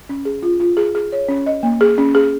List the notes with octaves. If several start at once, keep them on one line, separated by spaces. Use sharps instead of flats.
C#4
G#4
F4
F4
G#4
G#4
C#5
C#4
D#5
A#3
G#4
C#4
G#4